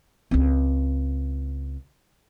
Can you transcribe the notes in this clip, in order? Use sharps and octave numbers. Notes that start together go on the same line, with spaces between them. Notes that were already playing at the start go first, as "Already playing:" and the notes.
C#2 C4